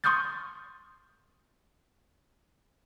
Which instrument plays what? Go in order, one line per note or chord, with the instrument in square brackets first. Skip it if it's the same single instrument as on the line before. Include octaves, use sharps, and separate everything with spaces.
[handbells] C6 C#6 D#6 F6 G6 A6